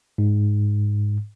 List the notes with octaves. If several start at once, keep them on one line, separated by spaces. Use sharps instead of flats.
G#2